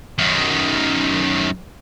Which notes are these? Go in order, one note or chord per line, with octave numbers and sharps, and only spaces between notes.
F#2 D#3